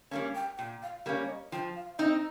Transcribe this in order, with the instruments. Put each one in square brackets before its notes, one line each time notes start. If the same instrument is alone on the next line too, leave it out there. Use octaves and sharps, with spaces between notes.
[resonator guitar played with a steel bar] G3 A#3 C#4 [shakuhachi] F5
[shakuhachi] G5
[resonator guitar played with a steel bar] A#2 [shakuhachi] G5
[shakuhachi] F5
[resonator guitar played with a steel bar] G3 A#3 C#4 [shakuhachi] F5
[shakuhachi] C#5
D#5
[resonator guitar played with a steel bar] F3 [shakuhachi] G5
[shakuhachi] F5
[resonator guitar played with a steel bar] C4 D#4 [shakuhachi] D#5